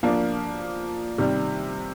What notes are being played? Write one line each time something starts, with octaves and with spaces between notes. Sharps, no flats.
F3 A#3 D4
C3 D#3 G3